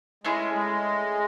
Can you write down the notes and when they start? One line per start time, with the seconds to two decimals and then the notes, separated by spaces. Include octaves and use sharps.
0.24 G#3 A3 C#4 E4 G#4
0.54 G#3